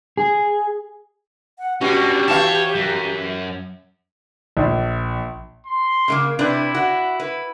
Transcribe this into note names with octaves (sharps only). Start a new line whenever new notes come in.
G#4
F#5
B2 C#4 D4 F#4 G4
E3 F#4 C#5 F5 A5
F#2
A#1
C6
C#3 A3 A#3
C3 D4 E4 B4
F#4
B4